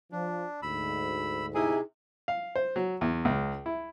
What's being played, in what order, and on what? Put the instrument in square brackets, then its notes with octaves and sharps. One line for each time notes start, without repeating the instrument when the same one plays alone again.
[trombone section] F3 [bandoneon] D4
[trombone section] D2 G#2 [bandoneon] B5 E6
[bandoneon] C3 [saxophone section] D#4 E4 G#4
[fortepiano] F5
C5
F#3
E2
C#2
E4